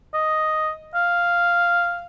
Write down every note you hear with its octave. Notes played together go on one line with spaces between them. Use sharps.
D#5
F5